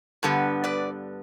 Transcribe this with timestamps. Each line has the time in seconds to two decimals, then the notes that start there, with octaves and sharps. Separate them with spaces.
0.23 G2 D3 G3 B3
0.64 B4 D5